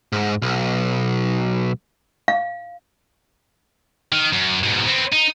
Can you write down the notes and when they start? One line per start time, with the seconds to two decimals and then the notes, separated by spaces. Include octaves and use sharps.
0.13 G#2
0.42 B1
2.28 F5
4.13 D#3
4.33 F#2
4.63 G#2 B2
4.87 B3 C4
5.13 D#4